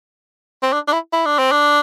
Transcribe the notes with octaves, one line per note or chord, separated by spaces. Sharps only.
C4
D4
D4
E4
E4
D4
C4
D4